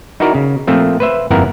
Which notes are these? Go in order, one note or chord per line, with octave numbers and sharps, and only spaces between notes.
D#4 E4 F#4 A#4 D5
C#3
A#2 F3 A3 C4
B4 C5 E5
G1 F2 A#2 E4 A#4 F#5